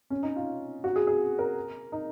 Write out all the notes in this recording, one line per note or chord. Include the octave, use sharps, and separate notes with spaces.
C#4
D#4
F4
F#4
G#4
G#4
A#4
D#4